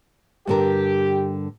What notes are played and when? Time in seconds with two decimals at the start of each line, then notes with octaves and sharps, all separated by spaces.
0.47 G2 D3 G4 A#4